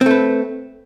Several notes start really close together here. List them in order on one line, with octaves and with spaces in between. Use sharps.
C4 A3 B4